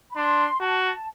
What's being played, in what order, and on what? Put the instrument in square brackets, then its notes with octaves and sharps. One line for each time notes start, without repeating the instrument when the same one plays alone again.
[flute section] B5
[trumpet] D4 [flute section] C6
[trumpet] F#4 [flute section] A5